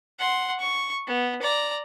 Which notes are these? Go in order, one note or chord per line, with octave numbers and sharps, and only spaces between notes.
F#5 C6
C#6
B3
D5 A#5